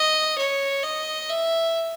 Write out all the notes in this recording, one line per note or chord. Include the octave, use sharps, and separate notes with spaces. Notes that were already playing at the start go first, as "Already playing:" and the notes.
Already playing: D#5
C#5
D#5
E5